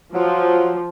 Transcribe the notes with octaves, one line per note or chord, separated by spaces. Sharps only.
F3 F#3